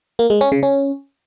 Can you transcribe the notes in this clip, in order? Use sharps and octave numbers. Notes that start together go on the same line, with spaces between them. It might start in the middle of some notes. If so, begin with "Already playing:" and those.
A#3
G#3
C#4
C#3
C#4